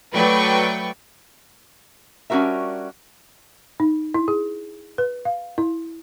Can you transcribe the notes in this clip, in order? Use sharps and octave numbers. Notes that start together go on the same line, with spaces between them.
F#3 A3 B4 D5 G5 C#6
G3 C#4 D4 F#4 A#4 E5
D#4
E4
G#4
B4
F5
E4